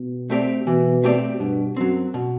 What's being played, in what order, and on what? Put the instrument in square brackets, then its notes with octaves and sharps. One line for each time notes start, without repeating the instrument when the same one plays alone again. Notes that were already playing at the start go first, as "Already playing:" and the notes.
Already playing: [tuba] B2
[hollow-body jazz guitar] A3 C4 G4 D5
[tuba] B2 [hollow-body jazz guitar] E3
[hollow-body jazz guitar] A3 C4 G4 D5
[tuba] G2 [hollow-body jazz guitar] B2
[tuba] F#2 [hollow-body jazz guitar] F#3 C4
[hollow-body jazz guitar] B2